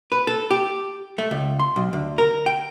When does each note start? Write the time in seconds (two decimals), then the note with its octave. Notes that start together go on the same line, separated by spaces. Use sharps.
0.12 B4
0.27 A4
0.51 G4
1.18 A3
1.31 C#2
1.59 C6
1.76 B1
1.93 D2
2.18 A#4
2.46 G5